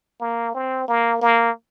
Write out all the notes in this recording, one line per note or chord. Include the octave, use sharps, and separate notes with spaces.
A#3
C4
A#3
A#3